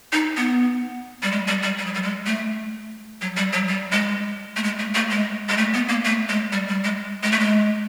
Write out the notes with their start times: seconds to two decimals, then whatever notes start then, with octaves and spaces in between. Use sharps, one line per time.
0.13 D#4
0.37 B3
1.23 G3
1.32 G#3
1.48 G3
1.63 G3
1.79 G3
1.86 F#3
1.94 G3
2.03 G#3
2.26 A3
3.21 F#3
3.37 G3
3.53 F#3
3.69 G3
3.92 G#3
4.56 A3
4.63 G#3
4.79 A3
4.95 A3
5.11 G#3
5.49 G#3
5.57 A3
5.74 B3
5.89 A#3
6.05 A3
6.29 G#3
6.52 G3
6.68 G3
6.84 G#3
7.23 G#3
7.32 A3
7.40 G#3